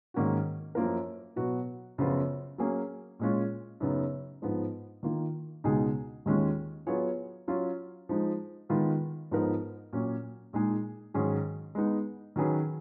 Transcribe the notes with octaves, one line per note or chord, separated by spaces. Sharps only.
G#2 D#3 A#3 C#4 F#4
F#2 F3 A#3 F4 A#4
B2 F#3 B3 F#4
F#2 C#3 F3 B3 F4
F#3 A#3 C#4 G#4
A#2 G#3 C#4 F4
F#2 C#3 F#3 B3 D#4
G#2 F3 B3 D#4
D#3 A#3 F4
C#2 B2 G#3 D#4 G#4
D#2 D#3 G#3 C#4 F4
F#3 B3 F4 G#4 C#5
F#3 C#4 F4
F3 G#3 D#4
D#3 G#3 B3 F4 B4
G#2 F3 B3 D#4 A#4
A#2 F#3 C#4
A#2 G#3 D#4 G#4
G#2 D#3 F#3 C#4 G#4
G#3 B3 D#4
D#3 F#3 C#4 G#4 B4